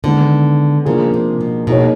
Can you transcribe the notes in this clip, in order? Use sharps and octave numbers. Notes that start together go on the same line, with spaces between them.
D3 D#3 G#3 B3 D#4
C#3 F3 A#3 D4 F4 G#4
C3
B2
B2 A#3 D#4 G#4 C#5